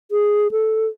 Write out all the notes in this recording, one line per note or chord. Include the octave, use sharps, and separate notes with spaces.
G#4
A4